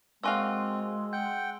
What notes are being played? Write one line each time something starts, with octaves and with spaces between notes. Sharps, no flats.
G#3 A#3 C4 F#4 F5 G#5 C6 E6
F#5 G5 G6